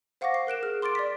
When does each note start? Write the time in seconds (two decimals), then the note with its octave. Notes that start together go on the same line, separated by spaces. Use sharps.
0.21 C5 F5 F#5 C#6 D6 A#6
0.34 C7
0.47 A#4 F#6 D7 E7
0.62 G#4 F6
0.82 C6 D6 F6 A6 D7
0.95 D5 B6